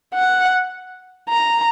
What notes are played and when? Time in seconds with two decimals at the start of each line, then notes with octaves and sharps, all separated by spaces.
0.14 F#5
1.29 A#5